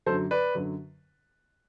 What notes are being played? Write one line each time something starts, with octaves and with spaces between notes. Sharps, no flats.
F#2 D3 F#3 A4 C5
B4 D5
F#2 D3 F#3